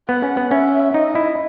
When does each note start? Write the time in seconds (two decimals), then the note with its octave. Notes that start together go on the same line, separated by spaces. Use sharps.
0.09 B3 F#5
0.23 C#4
0.37 B3
0.51 C#4 E5
0.94 D#4 D#5
1.15 E4